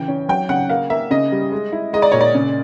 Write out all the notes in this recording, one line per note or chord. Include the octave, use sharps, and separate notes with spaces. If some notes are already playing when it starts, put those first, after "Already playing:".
Already playing: C#3 E3 G5
C#4
F#3 G5
C#3 F#5
A#3 F5
A#3 E5
C#3 D#5
G3
G#3
E4
G#3 D#5
D5
A#2 C#5
D5
C#3